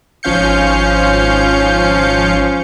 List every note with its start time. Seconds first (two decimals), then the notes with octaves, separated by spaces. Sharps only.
0.23 G#1 F3 C#4 F5 G6 C#7